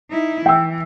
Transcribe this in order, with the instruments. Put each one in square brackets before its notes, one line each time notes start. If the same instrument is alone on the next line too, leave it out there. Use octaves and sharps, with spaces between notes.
[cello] D#4 E4
[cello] E3 [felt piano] G5 E6